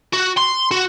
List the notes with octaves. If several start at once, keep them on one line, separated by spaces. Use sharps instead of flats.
F#4
C6
F#4